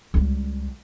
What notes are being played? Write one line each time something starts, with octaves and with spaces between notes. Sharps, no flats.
C#2 G3